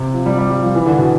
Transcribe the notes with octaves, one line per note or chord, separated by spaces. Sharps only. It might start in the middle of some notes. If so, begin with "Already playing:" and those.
Already playing: C3
F3
G3
G3
G3
F3
E3
D3
B2